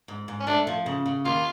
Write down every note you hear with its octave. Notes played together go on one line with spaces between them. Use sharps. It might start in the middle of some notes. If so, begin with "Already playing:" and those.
G#2
G#2
C#4
A3 D4
F3
C#3
C#3
D#2 F4